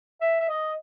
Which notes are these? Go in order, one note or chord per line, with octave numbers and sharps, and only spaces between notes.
E5
E5
D#5